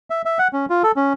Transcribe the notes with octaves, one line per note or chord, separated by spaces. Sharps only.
E5
E5
F#5
C#4
F4
A4
C#4